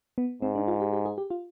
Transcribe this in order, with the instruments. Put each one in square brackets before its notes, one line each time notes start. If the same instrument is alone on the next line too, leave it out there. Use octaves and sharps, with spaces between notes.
[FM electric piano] B3
[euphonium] G#2 [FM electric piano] C4
[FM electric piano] D4
F4
G4
G4
G#4
G4
F4